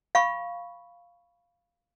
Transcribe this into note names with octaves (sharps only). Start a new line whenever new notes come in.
F5 B5 C#6